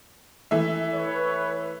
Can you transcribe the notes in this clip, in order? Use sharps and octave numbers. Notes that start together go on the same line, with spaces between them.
E3 A3 E5
B4 C#5